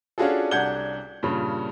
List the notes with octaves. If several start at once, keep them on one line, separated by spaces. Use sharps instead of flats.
C#4 D4 F4 F#4 G#4 A4
C2 D4 F#5 G6 G#6 G7
G2 A#2 C#3